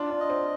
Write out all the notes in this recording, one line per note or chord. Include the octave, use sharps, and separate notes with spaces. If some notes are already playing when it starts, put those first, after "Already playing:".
Already playing: D4 F4
D4
D#5
C4